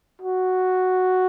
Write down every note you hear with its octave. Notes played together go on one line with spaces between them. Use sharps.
F#4